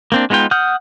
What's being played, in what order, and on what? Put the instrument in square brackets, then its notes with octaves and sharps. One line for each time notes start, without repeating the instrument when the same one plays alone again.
[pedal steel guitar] A#3 C4 D4
G#3 B3 D#4 F4 G5
F#5 D#6 F6 G6